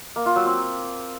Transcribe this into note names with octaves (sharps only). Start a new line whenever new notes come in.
A#3
F4
F#3
C4